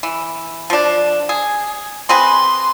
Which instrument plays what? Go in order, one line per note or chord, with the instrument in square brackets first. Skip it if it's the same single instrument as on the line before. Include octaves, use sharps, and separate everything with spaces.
[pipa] E3
F3 D4
G#4
[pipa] C4 G#4 B4 [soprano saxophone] C6